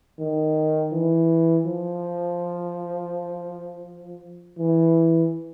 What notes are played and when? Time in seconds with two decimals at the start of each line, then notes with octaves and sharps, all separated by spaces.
0.19 D#3
0.92 E3
1.65 F3
4.58 E3